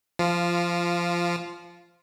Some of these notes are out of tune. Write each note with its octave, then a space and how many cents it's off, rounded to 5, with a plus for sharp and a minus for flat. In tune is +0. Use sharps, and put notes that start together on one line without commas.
F3 -15 F4 +0